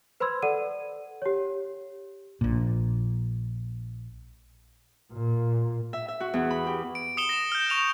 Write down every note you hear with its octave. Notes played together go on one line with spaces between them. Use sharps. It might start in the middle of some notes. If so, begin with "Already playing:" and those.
B4 C5 B5 C6 E6 G#6
A4 D5 F#5 D#7
G4 C#5
A#1 A#2
A#2
E5
E5
F#4
E2
B5
G4
D7
D#6 C#7 E7 G7
A#6 E7
F6 G6
C#6 F7